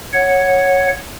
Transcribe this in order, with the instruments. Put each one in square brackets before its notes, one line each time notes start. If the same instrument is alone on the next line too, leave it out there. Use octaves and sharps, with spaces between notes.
[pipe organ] C#5 F#5